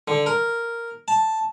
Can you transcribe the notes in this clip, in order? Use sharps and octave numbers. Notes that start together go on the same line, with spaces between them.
D3
A#4
A5